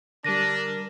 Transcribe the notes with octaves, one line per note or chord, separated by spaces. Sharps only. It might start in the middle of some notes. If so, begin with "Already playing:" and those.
D3 G3 D4 A#4 A#6 D#7